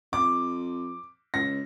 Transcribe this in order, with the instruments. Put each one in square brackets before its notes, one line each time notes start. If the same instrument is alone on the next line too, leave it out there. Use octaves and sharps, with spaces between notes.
[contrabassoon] F2 [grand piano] D6
[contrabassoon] C#2 [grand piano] A#6